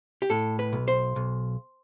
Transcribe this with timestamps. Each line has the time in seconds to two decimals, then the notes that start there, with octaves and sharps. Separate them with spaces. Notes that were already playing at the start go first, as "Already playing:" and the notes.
0.22 G4
0.30 A2 A4
0.59 B4
0.73 B1
0.88 C5
1.16 B1